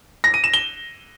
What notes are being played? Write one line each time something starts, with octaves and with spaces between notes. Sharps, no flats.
A#6
D#7
E7
G7